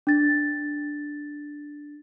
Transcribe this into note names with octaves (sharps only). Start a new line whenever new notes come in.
D4 A6